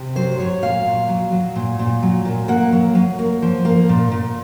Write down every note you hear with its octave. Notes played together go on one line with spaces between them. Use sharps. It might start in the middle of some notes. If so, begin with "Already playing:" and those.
Already playing: C3
F#3 C5
F#3 C#5
A#2 F5
A#2
F#3
F#3
A#2
A#2
F#3
A#2
A#3 F#5
F#3
F#3
A#3
F3
A#3
A#2
A#2